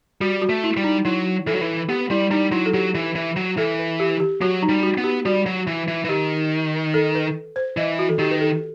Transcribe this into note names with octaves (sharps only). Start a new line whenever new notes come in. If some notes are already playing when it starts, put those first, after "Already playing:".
G3 F#4
F#4
A3
E4
G3
D#4
F#3 E4
E3 A4
F#3
E3
B3 G4
G3 E4
G3 D#4
F#3 E4
A4
F#3 G4
E3
E3
F#3
E3 A4
B4
G4
G4
F#3 F#4
D#4
G3
F#4
B3
G4
G3 F#4
F#3
E3
E3
E3
D#3 G4
A4
B4
C5
E3 D#5
F#4
A4
D#3 G4
B4
A4